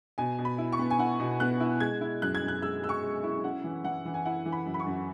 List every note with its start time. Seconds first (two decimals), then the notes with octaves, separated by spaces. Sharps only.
0.18 B2 G#5
0.39 B2
0.45 B5
0.58 E4
0.72 C#6
0.79 B3
0.90 G#5
0.99 E4 F#5
1.20 B2
1.40 B3 F#6
1.60 E4
1.80 G#3 G#6
2.01 E4
2.22 F#2 F#6
2.35 G#6
2.42 F#2
2.48 F#6
2.62 G#3 E6
2.83 G#3 E6
2.89 C#6
3.03 G#3
3.23 E4
3.44 C#4 F#5
3.64 E3
3.84 E3 F#5
4.05 E3
4.14 G#5
4.25 E4 F#5
4.45 E3
4.52 B5
4.66 F#2
4.74 B5
4.80 C#6
4.87 F#2